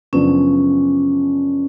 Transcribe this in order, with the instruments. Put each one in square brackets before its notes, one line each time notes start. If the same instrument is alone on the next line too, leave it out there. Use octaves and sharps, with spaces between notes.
[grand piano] F#2 C#3 F3 B3 D4 [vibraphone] C#4